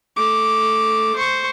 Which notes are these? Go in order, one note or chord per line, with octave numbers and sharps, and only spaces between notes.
A3 D6
C5 C#6